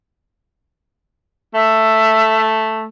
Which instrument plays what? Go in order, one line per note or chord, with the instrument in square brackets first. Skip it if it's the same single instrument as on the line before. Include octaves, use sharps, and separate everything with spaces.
[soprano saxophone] A3 [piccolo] E5